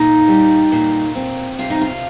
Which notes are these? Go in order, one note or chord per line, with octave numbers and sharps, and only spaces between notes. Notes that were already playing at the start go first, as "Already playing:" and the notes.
Already playing: A#2 D#4
G3
A#2
C4
C3 F4
D#4
F4